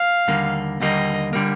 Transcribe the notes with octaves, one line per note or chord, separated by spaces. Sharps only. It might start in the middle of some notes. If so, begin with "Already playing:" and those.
Already playing: F5
D#2 D3 G3 A#3
D#2 D3 G3 A#3 D#5
D3 G3 A#3